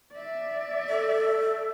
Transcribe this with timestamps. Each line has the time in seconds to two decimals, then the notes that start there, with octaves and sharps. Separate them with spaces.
0.13 D5 E5
0.89 A4